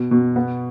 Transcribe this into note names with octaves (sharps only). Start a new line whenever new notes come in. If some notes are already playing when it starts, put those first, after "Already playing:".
Already playing: B2
B2
B3